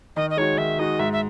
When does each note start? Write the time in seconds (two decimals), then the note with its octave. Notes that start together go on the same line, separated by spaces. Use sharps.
0.16 D#3 D#5
0.30 D#5
0.37 G#3 D#4 F#4 C#5
0.58 D#3 E5
0.79 G#3 D#4 F#4 D#5
0.99 G#2 E5
1.13 E5